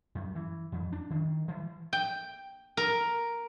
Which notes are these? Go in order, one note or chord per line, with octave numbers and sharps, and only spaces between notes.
F#2
E3
F2
D4
D#3
E3
G5
A#4